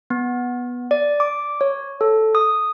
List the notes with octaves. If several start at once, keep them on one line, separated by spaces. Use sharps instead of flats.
B3
D5
D6
C#5
A4
D#6